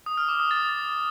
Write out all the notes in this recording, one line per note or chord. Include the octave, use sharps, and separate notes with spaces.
D#6
F6
D6
D#6
A6